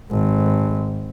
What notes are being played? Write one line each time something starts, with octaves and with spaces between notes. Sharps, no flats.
G#1